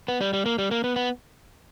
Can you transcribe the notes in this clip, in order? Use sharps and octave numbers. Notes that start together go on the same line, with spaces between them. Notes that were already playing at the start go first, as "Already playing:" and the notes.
B3
G3
G3
A#3
G3
A#3
B3
B3